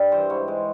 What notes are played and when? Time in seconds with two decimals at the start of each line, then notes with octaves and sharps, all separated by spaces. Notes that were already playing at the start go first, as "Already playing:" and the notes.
Already playing: G2 G3
0.12 E3 C5
0.30 G#2 C#5
0.48 G#3